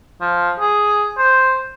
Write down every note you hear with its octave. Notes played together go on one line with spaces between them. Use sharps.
F3
G#4
C5